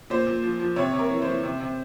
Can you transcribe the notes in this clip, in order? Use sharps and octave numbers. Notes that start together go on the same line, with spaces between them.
A#2 C5
A#2
F3
F3
C3 C#5
C3
A#4
E3
C5
E3
C3
C3